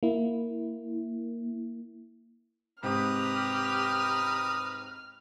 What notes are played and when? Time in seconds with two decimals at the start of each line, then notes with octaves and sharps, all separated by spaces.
0.03 A#3 E4
2.83 G#2 C3 C4 G4 B4 A#5 D#6 F6